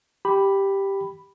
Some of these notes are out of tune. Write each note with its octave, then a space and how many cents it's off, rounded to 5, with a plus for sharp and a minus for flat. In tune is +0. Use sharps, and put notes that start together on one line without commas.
G4 +0 B5 +0